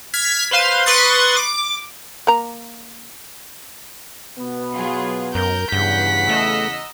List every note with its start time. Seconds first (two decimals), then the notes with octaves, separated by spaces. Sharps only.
0.14 F6 G#6 B6
0.51 B4 C5 F5 C6
0.86 B4 C6 C#6 D#6 F#6 A6
1.37 D6
2.27 A#3 A#5
4.37 B2 B3
4.74 F#3 F4 G#4
5.35 F#2 A#4 G6
5.72 E2 G2 C#3 F#5 B6
6.29 A3 D#5 A#5 E6